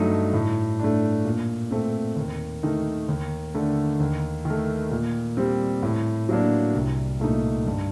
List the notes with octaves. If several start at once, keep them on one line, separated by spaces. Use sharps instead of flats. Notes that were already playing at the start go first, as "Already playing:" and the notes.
Already playing: G2 F#3 A3 D#4
A2
A3 D4
A#2
A3 C4
D#2
D#3 A3 D#4
D#2
D3 A3
D#2
D#3
A3
A#2
G3 C4
A2
F#3 A#3 D4
C2
A#2 A3 D#4
G2